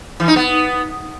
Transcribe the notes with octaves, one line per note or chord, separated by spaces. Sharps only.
E3
D#4
B3